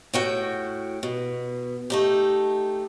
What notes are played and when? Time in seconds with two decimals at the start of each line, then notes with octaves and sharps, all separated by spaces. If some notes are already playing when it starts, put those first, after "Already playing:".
0.13 A2 F#4 G5
1.03 B2
1.90 A3 D#4 G4